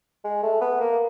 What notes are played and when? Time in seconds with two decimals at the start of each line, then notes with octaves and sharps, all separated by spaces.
0.24 G#3
0.43 A3
0.61 B3
0.80 A#3